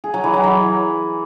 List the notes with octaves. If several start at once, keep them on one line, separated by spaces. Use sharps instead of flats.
G#4
F#3
E3
F#3
E3